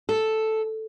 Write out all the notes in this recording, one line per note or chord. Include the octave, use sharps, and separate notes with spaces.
A4